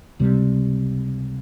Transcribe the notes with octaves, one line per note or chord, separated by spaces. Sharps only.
C#2 C3 G3